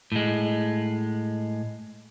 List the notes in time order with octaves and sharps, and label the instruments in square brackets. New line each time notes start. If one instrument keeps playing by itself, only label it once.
[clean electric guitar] A2 G#3